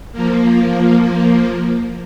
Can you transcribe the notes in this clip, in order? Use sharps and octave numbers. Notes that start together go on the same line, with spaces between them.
F3 A#3